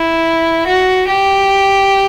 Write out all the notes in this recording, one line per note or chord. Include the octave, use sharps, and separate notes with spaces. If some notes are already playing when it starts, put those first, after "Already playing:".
Already playing: E4
F#4
G4